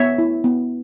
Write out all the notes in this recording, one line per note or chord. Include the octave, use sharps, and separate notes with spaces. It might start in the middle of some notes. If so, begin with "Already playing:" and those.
Already playing: B3 C#5 E5
E4
B3